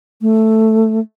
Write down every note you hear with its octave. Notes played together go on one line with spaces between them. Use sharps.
A3